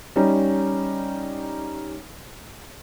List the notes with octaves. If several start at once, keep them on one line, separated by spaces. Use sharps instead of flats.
G3 C#4 D#4